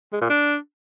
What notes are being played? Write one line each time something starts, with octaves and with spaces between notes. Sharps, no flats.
G#3
A#2
D4